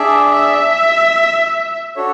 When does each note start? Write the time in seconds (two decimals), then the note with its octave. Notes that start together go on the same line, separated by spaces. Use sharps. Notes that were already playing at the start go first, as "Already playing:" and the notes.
Already playing: D4 G#4 D5 E5
0.32 E5
1.96 D4 F#4 A4 C#5